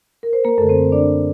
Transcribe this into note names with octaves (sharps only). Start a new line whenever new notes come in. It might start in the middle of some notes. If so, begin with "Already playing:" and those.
A#4
C5
A#3 A#4
F#2 D3 A3 A4
C4 C5
C5
D4 D5